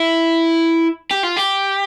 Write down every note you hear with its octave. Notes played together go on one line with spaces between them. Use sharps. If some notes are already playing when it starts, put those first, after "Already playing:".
Already playing: E4
G4
F4
G4